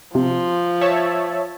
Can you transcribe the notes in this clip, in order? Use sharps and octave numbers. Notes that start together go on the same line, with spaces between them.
C3 F3
C#5 E5 A5